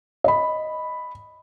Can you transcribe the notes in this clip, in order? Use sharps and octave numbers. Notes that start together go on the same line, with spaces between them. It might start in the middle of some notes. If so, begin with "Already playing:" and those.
D#5 B5